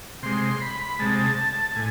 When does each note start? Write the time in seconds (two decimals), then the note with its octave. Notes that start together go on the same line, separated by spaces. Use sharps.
0.23 C3 G#3 C6
0.61 B5
0.99 C3 G#3 A5
1.71 A5
1.76 A2 G#5